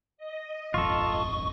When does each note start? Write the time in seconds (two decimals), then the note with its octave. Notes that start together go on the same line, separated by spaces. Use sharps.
0.18 D#5
0.74 D#1 G#1 F2 F4 A4 C#6